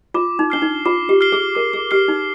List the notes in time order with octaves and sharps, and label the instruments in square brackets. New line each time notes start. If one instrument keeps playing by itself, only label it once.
[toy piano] F4 [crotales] D6
[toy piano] D#4
[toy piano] D4 [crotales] F6 C7 G7
[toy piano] D#4
[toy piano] F4 [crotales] D6
[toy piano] G4
[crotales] F6 C7 G7
[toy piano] G#4
[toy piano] A#4 [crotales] D6
[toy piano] G#4
[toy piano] G4 [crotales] F6 C7 G7
[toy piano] D#4